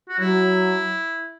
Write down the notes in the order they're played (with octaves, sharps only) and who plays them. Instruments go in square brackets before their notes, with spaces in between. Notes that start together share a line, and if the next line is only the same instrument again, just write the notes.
[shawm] F#4
[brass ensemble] F#3 [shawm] E4